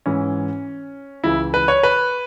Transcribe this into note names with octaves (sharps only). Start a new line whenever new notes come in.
G#2 E3 C#4
C#2 C#3 E3 E4
B4
C#5
B4